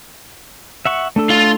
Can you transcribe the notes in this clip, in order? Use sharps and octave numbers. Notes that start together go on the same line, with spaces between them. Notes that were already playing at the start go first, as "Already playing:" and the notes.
E5 F#5 C#6
A3 D4 A4
F4 F5